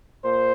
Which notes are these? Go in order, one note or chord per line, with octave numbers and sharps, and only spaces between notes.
A#2 C5